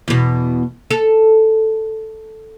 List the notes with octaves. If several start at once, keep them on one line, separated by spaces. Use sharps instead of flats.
E2 B2
A4